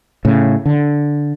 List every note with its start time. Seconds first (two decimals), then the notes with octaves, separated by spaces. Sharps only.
0.25 A2 C#3
0.66 D3